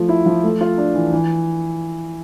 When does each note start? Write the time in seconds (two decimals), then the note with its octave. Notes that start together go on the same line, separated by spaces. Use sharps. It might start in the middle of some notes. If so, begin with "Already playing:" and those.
Already playing: F3 A3
0.09 E4
0.26 F3
0.44 A3
0.61 F4
0.78 D4
0.95 E3
1.12 E3